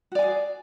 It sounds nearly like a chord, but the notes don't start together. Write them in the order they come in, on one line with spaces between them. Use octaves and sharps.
F#4 D5 G#5 G#4